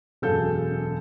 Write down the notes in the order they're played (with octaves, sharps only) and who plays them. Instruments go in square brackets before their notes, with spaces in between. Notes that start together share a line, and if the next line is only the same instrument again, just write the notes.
[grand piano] E1 F#2 G#4 A4 F5 G6